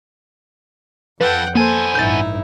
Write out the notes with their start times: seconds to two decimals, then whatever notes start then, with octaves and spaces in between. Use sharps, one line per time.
1.21 F2 F3 A4 B4 F#5 G5
1.55 A#3 B3 A4 C5 G#5
1.95 A1 G2 D#4 E4 G6 A6